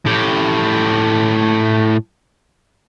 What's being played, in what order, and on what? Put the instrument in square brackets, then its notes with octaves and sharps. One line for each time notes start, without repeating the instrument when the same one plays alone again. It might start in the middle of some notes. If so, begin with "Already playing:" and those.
[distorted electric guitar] A2 G4